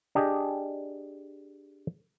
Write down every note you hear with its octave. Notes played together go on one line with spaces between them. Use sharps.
D4 G4 G#4 D#5